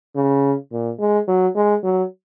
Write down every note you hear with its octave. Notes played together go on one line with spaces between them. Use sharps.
C#3
A#2
G#3
F#3
G#3
F#3